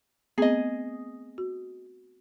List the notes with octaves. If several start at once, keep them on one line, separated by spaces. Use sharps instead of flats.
A3 B3 C4 G#4 D#5
F#4